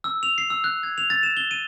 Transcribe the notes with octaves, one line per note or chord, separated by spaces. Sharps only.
E6
F7
C7
E6
F#6
G#6
F7
A6
E7
G7
D#7